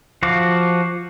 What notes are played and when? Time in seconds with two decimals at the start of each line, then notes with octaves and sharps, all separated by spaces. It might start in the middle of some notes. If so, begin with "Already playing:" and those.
0.23 F3 F#4 F5 D6